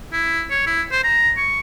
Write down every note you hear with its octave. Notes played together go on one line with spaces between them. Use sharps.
E4
C#5
E4
C5
A#5
C#6